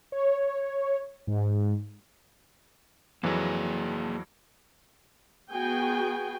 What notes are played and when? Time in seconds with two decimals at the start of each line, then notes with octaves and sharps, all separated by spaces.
0.12 C#5
1.27 G#2
3.23 F2 E3 F#3 A#3 G#4
5.52 B3 F#4 G#4 G5 G#5